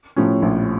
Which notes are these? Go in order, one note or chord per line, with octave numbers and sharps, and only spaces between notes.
A2 F3 C#4
A#1